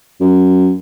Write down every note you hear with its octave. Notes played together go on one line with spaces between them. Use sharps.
F#2